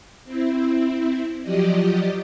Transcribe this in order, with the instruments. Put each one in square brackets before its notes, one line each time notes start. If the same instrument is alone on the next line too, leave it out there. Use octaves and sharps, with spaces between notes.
[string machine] C4 E4
F3 F#3 G4 D5 D#5